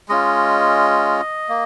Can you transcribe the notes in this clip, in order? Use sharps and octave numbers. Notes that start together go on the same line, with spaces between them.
G#3 C#4 F4 D#5
A#3